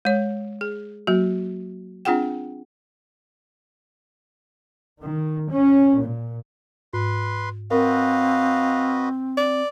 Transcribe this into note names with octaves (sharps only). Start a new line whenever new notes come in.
G#3 C#5
G#4
F#3 A#3 F#4
C4 D4 F4 G#4 F#5 G5
D#3
C#4
A#2
G#2 B4 C6
C4 F#4 A#4 B4 D#5 F5
D5